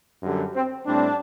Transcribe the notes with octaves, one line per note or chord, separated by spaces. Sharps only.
F#2 D3 G3
C4
A2 G3 C4 D4